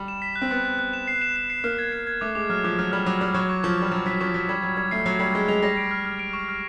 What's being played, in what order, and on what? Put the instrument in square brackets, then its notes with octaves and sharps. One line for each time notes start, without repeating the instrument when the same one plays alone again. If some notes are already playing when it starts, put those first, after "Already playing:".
Already playing: [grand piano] G3
[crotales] E7
B6
F#6
[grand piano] C4
[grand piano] B3 [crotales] F#6
[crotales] F#6
F#6
E7
C7
E7
E7
C7
[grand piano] A#3 [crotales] F6
[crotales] G#6
C7
G#6
[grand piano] A3 [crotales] D6
[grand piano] G#3 [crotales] D6
[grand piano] F#3 [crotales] F6
[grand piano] F3 [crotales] D6
[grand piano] F#3 [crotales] F6
[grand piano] G3 [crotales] F6
[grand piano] F#3 [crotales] D6
[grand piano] G3 [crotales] D6
[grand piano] F#3 [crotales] C#6
[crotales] C#6
[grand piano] F3 [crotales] C#6
[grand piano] G3 [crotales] C#6
[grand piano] F#3 [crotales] C#6
[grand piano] F#3 [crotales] B6
[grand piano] F3 [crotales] C#6
[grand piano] F#3 [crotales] B6
[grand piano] G3 [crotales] G#6
[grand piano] F#3 [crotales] G#6
[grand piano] G3 [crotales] G#6
[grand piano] A3 [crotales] C7
[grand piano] F#3 [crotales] C7
[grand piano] G3 [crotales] C7
[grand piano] G#3 [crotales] G#6
[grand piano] G#3 [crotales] F7
[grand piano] G3 [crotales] A#6
[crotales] D7
F6
F6
D7
C#6
F6